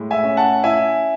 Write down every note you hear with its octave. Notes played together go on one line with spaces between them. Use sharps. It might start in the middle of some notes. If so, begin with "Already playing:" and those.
Already playing: A2 G#3
E5 G#5
C#4
F#5 A5
E4 E5 G#5